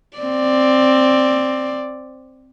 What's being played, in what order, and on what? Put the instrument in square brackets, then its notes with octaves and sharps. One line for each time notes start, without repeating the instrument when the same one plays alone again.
[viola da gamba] C4 D5